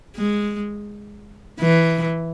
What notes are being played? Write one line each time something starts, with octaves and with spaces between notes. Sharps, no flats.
G#3
E3